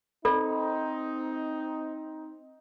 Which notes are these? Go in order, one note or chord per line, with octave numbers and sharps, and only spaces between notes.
C4 D#4 A4 D5 B5